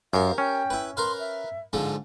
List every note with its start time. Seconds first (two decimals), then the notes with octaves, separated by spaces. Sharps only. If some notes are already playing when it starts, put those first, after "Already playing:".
0.13 F#2 G4 A#4 F5
0.38 C#4 G5
0.70 E4 B4
0.97 A#4 B4 F5 C6
1.19 E5
1.73 G#2 D3 F3 F5